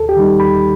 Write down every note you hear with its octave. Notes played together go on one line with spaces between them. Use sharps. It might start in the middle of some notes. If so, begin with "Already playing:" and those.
Already playing: D#2 A4
G4
D#3 G3 D#4
D#2 B5